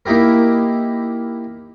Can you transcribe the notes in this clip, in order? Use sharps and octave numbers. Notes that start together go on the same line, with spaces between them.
A#3 D#4 E4 G4 A#4